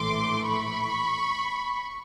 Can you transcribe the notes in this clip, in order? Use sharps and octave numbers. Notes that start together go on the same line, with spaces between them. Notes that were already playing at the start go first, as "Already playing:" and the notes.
Already playing: A#1 A2 E3 A3 C6 D6
B5 C#6